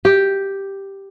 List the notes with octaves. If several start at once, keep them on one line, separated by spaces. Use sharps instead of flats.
G4